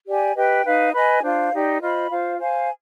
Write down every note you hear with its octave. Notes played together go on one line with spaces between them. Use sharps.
G4 D5 G#5
G4 B4 D#5 G5
D#4 B4 F5
B4 D#5 G#5 B5
D4 F4 C5 F5
D#4 G4 D5
F4 C5 D#5 B5
F4 C5 F5
C5 F5 G#5